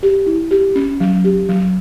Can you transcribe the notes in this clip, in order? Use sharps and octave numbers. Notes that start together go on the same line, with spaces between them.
G4
E4
G4
C#4
F#3
G4
F#3